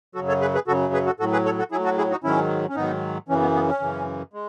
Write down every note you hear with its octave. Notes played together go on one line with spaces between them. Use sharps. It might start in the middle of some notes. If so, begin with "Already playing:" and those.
F#2 C#3 F#3 F#4 A4
A4 C#5
G#4 B4
G#4 B4
F#2 C#3 F#3 F#4 A4
G#4 B4
F#4 A4
A2 F#3 F#4 A4
G#4 B4
A4 C#5
F#4 A4
A2 F#3 E4 G#4
F#4 A4
E4 G#4
D#4 F#4
G#2 D#3 F#3 C#4 E4
C#4
G#2 D#3 F#3 B3 D#4
F#2 C#3 E3 C#4
B3
B3
C#4
F#2 C#3 E3
G#3